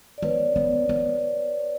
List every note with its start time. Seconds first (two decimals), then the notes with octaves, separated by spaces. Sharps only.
0.18 D5
0.22 B3 B4 C#5
0.56 B3
0.89 B3